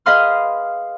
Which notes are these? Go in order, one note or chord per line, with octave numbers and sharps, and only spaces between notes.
G#4 B4 D#5 F5 C6 F6